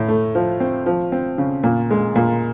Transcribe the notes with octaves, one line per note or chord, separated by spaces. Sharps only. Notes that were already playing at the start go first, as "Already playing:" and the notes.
Already playing: A2
A3
F3
C4
F3
C4
C#3
A#2
G#3
A#2